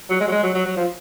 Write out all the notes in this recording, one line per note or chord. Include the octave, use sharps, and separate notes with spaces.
F#3
G#3
F#3
G#3
F#3
F#3
F#3
F3